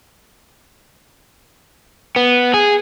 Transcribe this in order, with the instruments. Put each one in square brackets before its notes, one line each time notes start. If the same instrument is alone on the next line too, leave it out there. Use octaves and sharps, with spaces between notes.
[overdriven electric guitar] B3
G#4